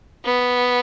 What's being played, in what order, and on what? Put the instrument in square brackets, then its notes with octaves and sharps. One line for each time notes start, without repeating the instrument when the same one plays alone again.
[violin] B3